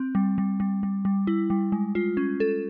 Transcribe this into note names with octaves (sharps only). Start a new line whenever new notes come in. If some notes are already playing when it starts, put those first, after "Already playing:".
Already playing: C4
G3
G3
G3
G3
G3
E4
G3
G#3
F4
C#4
A4